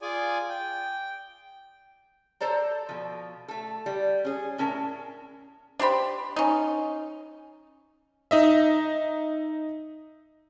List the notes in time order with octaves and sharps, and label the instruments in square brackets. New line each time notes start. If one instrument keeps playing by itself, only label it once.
[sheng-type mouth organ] F4 G#4 D5 G#5
G5
[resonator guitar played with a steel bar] A4 C5 D5 A#5
B2 F3
A3 A4
G3
C#4 G#4
A2 C#4 A#4 A5
[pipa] D4 G4 C5 B5
C#4 D#4
[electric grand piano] D#4 D#5 E5